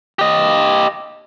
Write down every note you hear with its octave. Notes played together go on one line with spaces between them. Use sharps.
G4 D#5